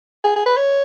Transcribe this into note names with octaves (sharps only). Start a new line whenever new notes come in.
G#4
G#4
B4
C#5